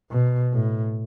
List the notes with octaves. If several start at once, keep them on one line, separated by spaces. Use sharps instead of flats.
B2
A2